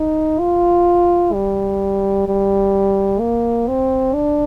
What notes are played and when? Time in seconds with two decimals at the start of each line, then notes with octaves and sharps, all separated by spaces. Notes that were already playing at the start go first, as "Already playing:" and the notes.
Already playing: D#4
0.40 F4
1.33 G3
2.27 G3
3.20 A#3
3.68 C4
4.14 D4